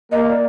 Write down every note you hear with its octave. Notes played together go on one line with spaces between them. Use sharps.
A#3 D#5
D5